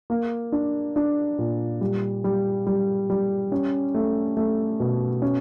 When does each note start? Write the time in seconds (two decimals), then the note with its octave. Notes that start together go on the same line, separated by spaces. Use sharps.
0.10 A#3
0.52 D4
0.96 D4
1.38 A#2
1.81 G3
2.24 G3
2.67 G3
3.10 G3
3.52 C#4
3.95 A3
4.37 A3
4.80 B2
5.22 C#4